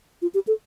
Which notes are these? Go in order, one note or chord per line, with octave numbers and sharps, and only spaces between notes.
F4
G4
A4